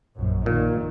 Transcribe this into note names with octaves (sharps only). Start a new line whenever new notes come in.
A#1 F#2
A#2 D#3